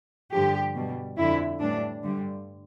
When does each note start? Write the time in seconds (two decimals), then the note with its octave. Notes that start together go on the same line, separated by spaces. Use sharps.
0.32 G2 D3 F3 G4
0.75 B2 G3
1.17 F2 D3 F3 E4
1.60 A2 E3 G3 D4
2.03 G2 D3 G3